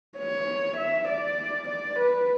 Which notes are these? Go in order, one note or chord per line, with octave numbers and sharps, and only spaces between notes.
C#5
E5
D5
D5
B4